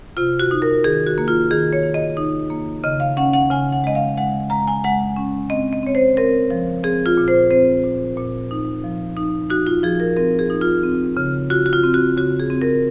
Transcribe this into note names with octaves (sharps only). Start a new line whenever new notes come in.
C3 F4
F#4
D#4
A#4
D#3 G#4
F#4
A#3
F4
D#3 G#4
C#5
D#3
D#5
D#4
A#3
C#3 D#5
F5
C#4 F#5
F#5
C#3 G#5
F#5
G#3 D#5
F5
G#3 F#5
G#3 A#5
G#5
G#3 F#5
C#4
C4 D#5
D#5
C4 C#5
C5
C4 A#4
F3
C4 G#4
F4
A#2
C5
C4 C5
A#2
A#2
D#4
F3
D#4
D#4 F#4
F4
F3 G#4
A#4
C4 A#4
G#4
D#4
F4
C4
C#3
F4 F#4
F#4
F4
C4
F#4
C#3 F#4
G#4
C4
A#4